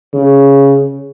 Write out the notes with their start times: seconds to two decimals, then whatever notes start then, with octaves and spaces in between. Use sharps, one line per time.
0.14 C#3